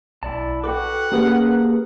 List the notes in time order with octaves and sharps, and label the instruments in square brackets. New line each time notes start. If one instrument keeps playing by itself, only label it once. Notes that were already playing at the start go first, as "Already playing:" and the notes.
[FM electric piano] B1 [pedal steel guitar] E4 D5 A5
[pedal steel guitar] F#4 B4 D6 [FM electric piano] A4 G5 [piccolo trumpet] F#5
[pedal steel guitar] A#3 G#4 A#4 [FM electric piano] C#4 G4 B4